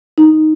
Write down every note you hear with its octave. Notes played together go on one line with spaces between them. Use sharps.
D#4